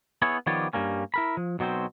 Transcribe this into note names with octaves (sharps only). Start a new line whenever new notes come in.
B3 E4 G#4 C#5
D#3 F3 B3 G4 C#5 D5
G2 G3 A#3 C#4
E4 A#4 B5
F3
B1 B2 F#3 C4 C5